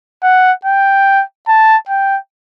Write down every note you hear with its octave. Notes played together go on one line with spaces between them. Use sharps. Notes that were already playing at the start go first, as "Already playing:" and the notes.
F#5
G5
A5
G5